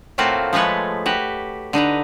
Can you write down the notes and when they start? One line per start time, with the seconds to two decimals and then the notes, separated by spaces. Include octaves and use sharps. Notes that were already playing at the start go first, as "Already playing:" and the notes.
0.18 A2 A3 A#3 C4 F4 F#4
0.53 F3 G#3 A3 B4 C#5
1.06 F#4 G4 B4
1.73 D3 D#4 B4 A#5